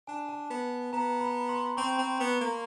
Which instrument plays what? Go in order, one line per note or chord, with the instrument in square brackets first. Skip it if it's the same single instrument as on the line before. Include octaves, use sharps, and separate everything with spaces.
[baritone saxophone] D4 [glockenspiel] G#5
[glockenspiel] A5
[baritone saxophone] B3
[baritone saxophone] B3 [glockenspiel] A#5
[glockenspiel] B5
C6
[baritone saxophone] C4 [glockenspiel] C#6
[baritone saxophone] C4
B3
A#3